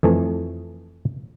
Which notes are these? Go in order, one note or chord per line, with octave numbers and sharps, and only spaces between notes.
F2 E3 A3